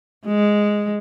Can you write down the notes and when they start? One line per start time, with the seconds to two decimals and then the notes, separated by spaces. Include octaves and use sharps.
0.26 G#3